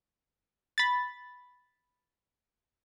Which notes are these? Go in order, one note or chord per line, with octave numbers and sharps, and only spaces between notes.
B5 A6